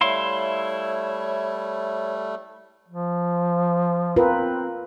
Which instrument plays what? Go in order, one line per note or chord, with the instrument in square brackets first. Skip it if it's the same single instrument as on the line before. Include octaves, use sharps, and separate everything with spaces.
[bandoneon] G3 A3 [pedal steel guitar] E4 F5 C6 [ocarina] C#5
[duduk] F3
[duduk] C4 [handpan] F4 A#4 B4